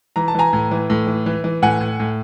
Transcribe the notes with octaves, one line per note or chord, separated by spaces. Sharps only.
E3 A#5
A5
E3 G#5 A#5
A2
E3
A2
E3
E3
E3
A2 F#5 G#5
A2
A2